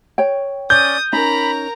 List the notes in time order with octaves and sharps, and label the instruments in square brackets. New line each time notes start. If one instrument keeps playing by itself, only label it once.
[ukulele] C#5 G5
[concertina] C#4 D5 [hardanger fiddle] D#6 [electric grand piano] G6
[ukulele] C#4 D#4 [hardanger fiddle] A#4 A#5 [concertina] B5